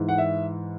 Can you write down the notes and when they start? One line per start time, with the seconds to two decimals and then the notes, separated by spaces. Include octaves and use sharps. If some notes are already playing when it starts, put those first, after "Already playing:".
Already playing: G#2 E3
0.09 F#5
0.18 E5